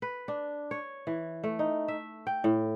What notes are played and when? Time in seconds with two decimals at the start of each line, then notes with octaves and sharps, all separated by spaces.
0.02 B4
0.28 D4
0.71 C#5
1.07 E3
1.43 A3
1.59 D#4
1.88 E5
2.27 G5
2.44 A2